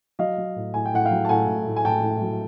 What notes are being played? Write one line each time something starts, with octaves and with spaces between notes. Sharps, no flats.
F#3 D#5 F5
F#3
A2
A2 G#5
G5
A2 F#5
F5 G5
F#3
A5
A2 F#5 G#5
A2
A2
G#5
A2 G5 A5
A2
F#3